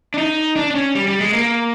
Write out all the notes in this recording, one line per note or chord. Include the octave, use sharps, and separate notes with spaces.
D4
D#4
D4
D4
C#4
G3
G3
G#3
A#3